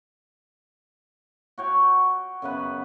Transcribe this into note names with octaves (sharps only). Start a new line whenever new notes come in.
F#4 C#5 G5
F#2 C#3 B3 B4